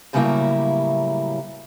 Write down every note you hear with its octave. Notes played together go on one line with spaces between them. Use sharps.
A2 C#3 F#3 G3 A#3 E4